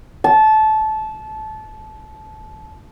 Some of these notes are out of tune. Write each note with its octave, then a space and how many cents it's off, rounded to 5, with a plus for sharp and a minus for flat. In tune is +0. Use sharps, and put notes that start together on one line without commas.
A5 -20